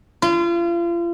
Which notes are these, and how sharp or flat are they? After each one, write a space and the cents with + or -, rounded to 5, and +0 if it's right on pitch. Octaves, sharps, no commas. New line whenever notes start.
F4 -35